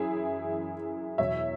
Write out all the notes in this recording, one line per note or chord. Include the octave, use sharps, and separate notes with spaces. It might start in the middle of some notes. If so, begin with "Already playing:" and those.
Already playing: F#2 E3 E4 G#4
E2 B2 F#3 C#5 E5